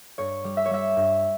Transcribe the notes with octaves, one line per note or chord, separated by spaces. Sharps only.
G2 C#5
G3
E5
C#5
G3 E5
G2